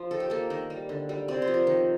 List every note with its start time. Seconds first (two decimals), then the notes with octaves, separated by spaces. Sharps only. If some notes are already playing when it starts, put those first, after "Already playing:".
Already playing: F3 F4
0.11 D#3 A4
0.20 G4
0.30 A#3 A4
0.50 D#3 A#4
0.70 G3
0.89 D3
1.09 G3
1.28 C3 D5
1.42 C5
1.47 F3
1.54 A#4
1.67 D#3